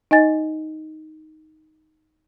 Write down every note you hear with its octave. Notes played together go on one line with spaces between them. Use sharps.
D#4 D#5 G#5 A6